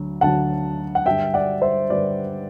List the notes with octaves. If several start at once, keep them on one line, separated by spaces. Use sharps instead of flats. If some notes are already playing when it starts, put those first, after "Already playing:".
Already playing: D2 D3 F#3
D2 D3 F#3 F#5 A5
F#5
G2 D3 G3 D4 E5 G5
D5 F#5
C5 E5
G2 D3 G3 D4 B4 D5